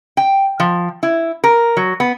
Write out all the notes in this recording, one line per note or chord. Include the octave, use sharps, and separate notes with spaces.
G5
F3
E4
A#4
F#3
B3